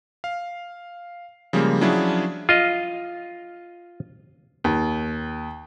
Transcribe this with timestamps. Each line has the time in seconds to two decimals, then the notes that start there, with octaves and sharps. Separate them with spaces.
0.24 F5
1.53 C#3 F3 G3 G#3 A#3
1.81 F3 F#3 C#4 D4 E4 G#4
2.49 F4 D#5
4.64 D#2